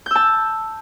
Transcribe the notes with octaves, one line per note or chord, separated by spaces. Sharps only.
A5 E6 G6